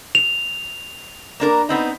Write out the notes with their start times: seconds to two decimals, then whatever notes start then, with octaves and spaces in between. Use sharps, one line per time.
0.15 F7
1.40 A#3 D4 A#4
1.69 B3 C4 D#4